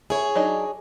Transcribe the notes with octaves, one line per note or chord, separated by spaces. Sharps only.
E4 G#4 C#5
F#3 D4 D#4